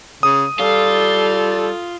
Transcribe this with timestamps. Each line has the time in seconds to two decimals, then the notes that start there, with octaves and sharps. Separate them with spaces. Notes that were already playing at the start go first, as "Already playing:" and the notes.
0.23 C#3 D#6
0.59 G3 F4 A4